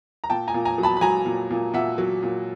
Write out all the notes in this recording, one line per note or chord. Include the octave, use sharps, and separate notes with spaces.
A#5
A#2 G5 A5
G#5 A#5
A#2
G#5 A#5
F#3
A5 B5
B5
F#3 G#5 A#5
A#2
A#2
A#2 E5 F#5
F#3
A#2